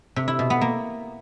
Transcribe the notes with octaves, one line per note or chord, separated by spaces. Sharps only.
C3
E4
B2
B3
A#3